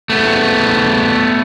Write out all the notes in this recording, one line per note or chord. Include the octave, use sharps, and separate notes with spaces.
A3 B3